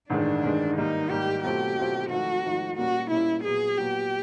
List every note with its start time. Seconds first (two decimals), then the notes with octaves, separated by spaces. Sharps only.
0.10 A1 G2 D#3 G#3 D4
0.43 A1 G2 D#3 G#3
0.77 G#2 D#3 G3 A#3 D#4
1.10 G#2 D#3 G3 A#3 G4
1.44 B2 F#3 A3 C4 F4 G4
1.77 B2 F#3 A3 C4 F4
2.10 G#1 G#2 F3 A3 F#4
2.44 G#1 G#2 F3 A3
2.77 A#2 G3 A#3 C#4 F#4
3.10 A#2 G3 A#3 C#4 E4
3.44 A#2 F#3 B3 G#4
3.77 A#2 F#3 B3 G4